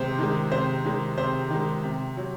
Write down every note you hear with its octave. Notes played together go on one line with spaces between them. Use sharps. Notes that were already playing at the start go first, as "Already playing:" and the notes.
Already playing: C3 D#3 G#3 C5
D#3 G#3
C3 C5
D#3 G#3
C3 C5
D#3 G#3
C3
F#3